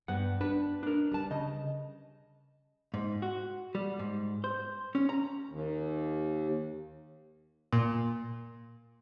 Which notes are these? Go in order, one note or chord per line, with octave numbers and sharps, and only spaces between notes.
G2 B3 F#5
D4 B4
D4 A#4
G3 B4 A5
C#3 D#5
G#2
F#4
G3
G#2
C5
C#4
A#5
D#2
A#2